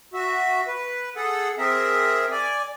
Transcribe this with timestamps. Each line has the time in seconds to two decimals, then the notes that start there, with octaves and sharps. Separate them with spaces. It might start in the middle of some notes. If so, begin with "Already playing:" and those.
0.14 F#4 E5
0.67 B4
1.16 G#4 A4 F#5
1.58 C4 G#4 A#4 E5
2.31 D5 G#5